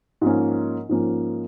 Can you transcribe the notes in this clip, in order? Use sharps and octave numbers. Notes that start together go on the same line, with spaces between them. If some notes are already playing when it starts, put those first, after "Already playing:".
G#2 F3 A#3 C#4
G#2 F3 A#3 C#4